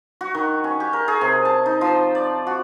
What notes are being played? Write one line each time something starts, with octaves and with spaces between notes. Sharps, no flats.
F#4
D#3
C#4
G4
A#4
G#4
C3
A5
D#4
F3
D5
F#4